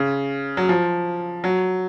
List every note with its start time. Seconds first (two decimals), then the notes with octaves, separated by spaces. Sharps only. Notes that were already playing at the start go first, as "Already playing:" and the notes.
Already playing: C#3
0.57 F#3
0.69 F3
1.44 F#3